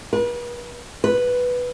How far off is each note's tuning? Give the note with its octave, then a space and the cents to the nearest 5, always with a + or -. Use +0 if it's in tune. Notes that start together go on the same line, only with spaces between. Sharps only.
B4 -40
B4 +0